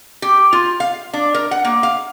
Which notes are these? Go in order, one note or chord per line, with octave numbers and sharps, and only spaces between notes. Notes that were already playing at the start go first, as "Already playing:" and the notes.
G4
F4
F5
D4
A#4
F#5
A#3
F5